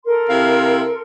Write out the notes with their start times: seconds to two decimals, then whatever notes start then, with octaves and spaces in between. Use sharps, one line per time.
0.04 A4 A#4 C6
0.28 C3 E4 F5